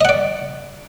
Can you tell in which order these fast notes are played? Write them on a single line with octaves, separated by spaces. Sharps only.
D#5 F#5 D5